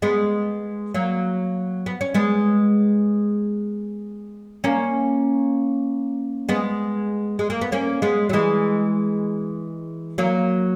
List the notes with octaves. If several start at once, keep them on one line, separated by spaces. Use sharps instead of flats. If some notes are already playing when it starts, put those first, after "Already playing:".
G#3 B3
F#3 A#3
B3
C#4
G#3 B3
A#3 C#4
G#3 B3
G#3
A#3
B3
A#3 C#4
G#3 B3
F#3
E3 G#3
F#3 A#3